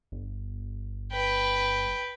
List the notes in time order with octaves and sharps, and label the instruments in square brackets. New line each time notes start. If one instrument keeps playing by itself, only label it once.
[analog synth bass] G1
[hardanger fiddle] B4 G5